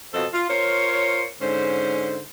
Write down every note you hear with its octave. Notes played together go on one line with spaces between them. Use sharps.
F2 B2 A4 C5 D#5
F4
F4 A#4 C5 C#5
G#2 D3 C#4 C5